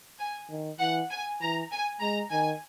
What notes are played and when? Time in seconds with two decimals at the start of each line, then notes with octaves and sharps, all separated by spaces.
0.19 G#5
0.50 D#3
0.80 E3 F#5
1.11 G#5
1.41 E3 A#5
1.71 G#5
2.01 G#3 A#5
2.32 D#3 G#5